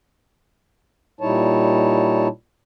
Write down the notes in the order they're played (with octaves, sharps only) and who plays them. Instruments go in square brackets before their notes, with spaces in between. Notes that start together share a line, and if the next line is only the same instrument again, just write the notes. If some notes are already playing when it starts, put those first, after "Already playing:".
[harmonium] A#2 G3 D#4 E4 C#5 A5